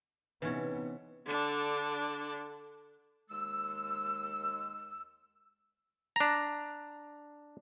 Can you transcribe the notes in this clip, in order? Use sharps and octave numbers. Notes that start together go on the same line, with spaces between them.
C3 E3 B3 C#4 D#4 B4
D3 D4
D#2 G#3 E6
D4 A#5